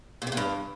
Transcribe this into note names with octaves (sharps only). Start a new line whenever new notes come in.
A#2
C3
A#2
G2